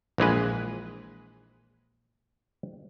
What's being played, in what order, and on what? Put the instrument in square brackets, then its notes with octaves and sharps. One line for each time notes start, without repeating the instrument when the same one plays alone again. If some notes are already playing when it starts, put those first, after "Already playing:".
[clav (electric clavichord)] A#1 E3 G#3 B4